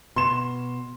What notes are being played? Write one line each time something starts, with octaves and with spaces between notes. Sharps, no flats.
B2 C6 E7